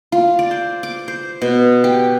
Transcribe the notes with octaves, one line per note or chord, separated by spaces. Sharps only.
F4
D5
C5
D6
C5
B2
G4